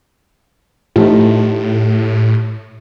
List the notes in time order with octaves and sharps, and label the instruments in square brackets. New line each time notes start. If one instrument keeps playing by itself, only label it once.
[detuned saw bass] A2 [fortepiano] F3 A3 D#4 [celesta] E4 G4